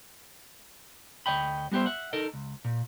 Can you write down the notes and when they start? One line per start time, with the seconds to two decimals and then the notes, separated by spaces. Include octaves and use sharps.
1.26 D2 C#5 D#5 G5 B5
1.71 G3 B3 G4 C5 E5
1.86 E5 F#5
2.13 D#4 A4 A#4 D#5
2.34 C#2
2.65 A#2